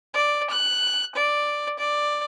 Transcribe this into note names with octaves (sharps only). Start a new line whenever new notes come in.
D5
F#6
D5
D5